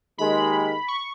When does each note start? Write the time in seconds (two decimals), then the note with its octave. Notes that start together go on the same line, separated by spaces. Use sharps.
0.18 D#2 D#3 G#3 B5
0.88 C#6